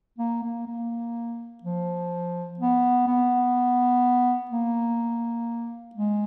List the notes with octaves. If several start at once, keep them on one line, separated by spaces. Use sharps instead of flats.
A#3
A#3
A#3
F3
B3
B3
A#3
G#3